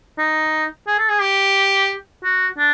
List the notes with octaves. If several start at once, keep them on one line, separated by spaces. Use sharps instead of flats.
D#4
G#4
A4
G#4
G4
F#4
D4